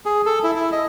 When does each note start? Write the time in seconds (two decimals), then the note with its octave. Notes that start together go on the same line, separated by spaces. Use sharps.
0.06 G#4
0.26 A4
0.43 E4
0.55 E4
0.72 D#5